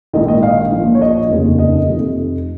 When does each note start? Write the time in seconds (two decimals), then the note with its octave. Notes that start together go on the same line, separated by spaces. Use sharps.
0.13 A#1 G#2 D#3 D#5
0.28 D#5
0.43 F5
0.72 A#1 A#2 F3
0.95 C#5
1.02 D#5
1.30 F1 D#2 C#3
1.59 D#5
1.88 F1 F2 C3